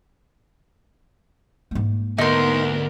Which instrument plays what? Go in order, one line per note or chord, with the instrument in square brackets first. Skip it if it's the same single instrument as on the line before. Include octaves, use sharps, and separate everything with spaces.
[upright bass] G#2 A#3
[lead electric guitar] D2 [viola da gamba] B3 A#4 [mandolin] D#4 C6